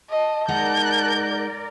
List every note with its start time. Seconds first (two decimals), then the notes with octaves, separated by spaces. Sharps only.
0.10 D#5 A5
0.48 G#3 D#4 A#4 D5 F#5 G6